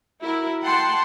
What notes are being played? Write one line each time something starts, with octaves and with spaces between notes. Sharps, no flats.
E4 F#4 A#4
F#5 G5 A5 C6